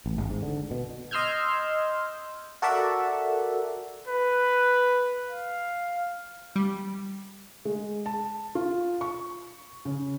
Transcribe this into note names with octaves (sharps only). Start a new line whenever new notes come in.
A1
G#1
G#2
D3
B2
D#5 C6 E6 F6 G6 G#6
F#4 A4 A#4 D5 E5 F#5
B4
F5
G3
G#3
A5
F4
C#6
C#3